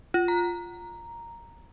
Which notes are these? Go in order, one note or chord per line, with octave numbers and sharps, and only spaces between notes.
F4
A#5